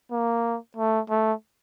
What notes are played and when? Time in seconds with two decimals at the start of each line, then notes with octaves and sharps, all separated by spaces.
0.11 A#3
0.77 A3
1.10 A3